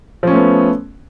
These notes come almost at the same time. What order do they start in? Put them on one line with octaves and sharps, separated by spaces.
F3 C#4 A3 B3